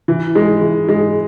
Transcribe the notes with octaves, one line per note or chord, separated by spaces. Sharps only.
E3
G#3
E3
G#3